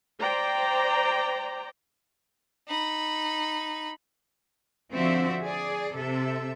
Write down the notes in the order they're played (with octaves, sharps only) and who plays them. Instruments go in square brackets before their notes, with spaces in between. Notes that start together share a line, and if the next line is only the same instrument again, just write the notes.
[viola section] C5 D5 G5 A#5
[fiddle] D#4 B5
[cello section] D3 F3 C4 F#4 E5
G#4 D5
C3 A4 E5